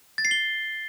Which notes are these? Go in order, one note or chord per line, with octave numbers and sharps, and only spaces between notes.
A6
C7
G7